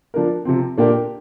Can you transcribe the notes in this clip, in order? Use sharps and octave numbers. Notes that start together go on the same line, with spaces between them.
F3 D4 A#4
C3 F3 C4
A#2 A#3 D4 G4 A#4